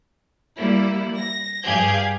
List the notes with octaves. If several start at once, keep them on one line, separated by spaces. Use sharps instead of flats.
G3 A#3 E4
A#6
G2 G4 G#4 F5 G6 G#6